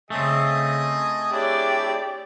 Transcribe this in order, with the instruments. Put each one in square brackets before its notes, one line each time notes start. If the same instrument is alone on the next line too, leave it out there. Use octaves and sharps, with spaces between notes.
[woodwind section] C#3 [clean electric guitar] A3 C4 [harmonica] G#4 D#5
[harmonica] D4 E4 [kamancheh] G4 D5 [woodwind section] G#4 C#5